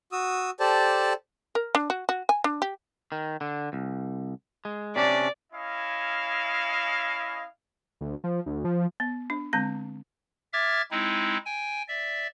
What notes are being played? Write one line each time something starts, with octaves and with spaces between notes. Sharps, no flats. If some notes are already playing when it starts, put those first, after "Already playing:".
F#4 D#6 E6
G4 A4 C5 D5 A5
A#4
D4
F#4
F#4
G#5
D4
G4
D#3
D3
C2
G#3
C3 C#4 D4 D5
C#4 E4 D#5 F5
D2
F3
D2
F3
B3
D4
D3 G#3 C4 A5
E5 D6 F6 G#6 A6
G#3 C4 D#4 E4
G5 G#5
D5 E5